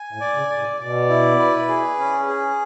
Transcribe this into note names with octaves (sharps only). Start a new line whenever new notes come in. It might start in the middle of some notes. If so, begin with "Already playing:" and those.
Already playing: G#5
A2
D5
C#3
D5
A2
B2 D5
E4
B4
G#4
C#4
G#4